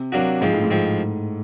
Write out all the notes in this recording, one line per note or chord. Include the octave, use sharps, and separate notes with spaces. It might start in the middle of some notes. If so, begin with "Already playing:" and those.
Already playing: C3
C3 F#3 A#3 D4 F#4
G#2 F3 G#3 C4
A2
G#2
F3 G#3 C4